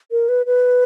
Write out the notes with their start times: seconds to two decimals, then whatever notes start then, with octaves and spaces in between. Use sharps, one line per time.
0.11 A#4
0.29 B4
0.46 B4